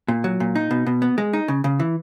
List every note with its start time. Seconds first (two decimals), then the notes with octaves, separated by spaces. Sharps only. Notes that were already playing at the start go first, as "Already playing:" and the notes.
0.08 A#2
0.24 F#3
0.40 A#2
0.55 D#4
0.71 B2
0.87 B2
1.02 B3
1.18 G#3
1.33 D#4
1.48 C#3
1.64 C#3
1.80 E3